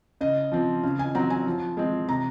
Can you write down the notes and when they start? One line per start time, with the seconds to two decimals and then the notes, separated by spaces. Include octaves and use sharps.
0.21 C#3 D#5
0.52 F3 C4
0.83 C#3
0.99 G#5
1.15 F#3 C4 A#5
1.30 G#5
1.46 F3
1.77 G#3 C4
2.09 C3 A#5